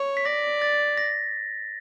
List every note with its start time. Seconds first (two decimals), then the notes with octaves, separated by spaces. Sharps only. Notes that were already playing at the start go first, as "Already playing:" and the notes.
Already playing: C#5
0.17 B6
0.25 D5 A#6
0.62 A6
0.97 A#6